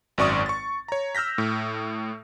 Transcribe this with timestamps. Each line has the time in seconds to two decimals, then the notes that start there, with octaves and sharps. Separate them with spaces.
0.18 G#1 F#2 D5 C#6 D#6
0.46 C#6 A6
0.88 C#5 A#5
1.15 E6 F6 G6 A#6 B6
1.38 A2